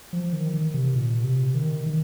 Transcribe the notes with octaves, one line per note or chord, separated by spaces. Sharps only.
F3
D#3
D#3
C3
A#2
C3
D#3
D#3